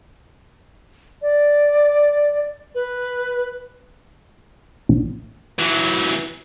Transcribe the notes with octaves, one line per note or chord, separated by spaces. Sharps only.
D5
B4
A#1
E3 F#3